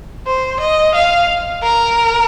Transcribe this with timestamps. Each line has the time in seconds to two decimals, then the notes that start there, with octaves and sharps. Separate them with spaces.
0.27 C5
0.60 D#5
0.95 F5
1.63 A#4